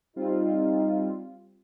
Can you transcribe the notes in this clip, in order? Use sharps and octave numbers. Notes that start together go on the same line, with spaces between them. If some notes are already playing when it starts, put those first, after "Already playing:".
G3 C4 D#4 F4